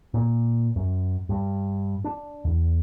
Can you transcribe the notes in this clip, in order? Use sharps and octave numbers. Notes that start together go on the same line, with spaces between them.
A#2
F#2
G2
D4
E2